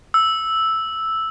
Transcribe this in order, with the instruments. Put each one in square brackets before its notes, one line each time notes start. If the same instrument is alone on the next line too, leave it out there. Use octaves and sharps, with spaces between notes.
[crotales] E6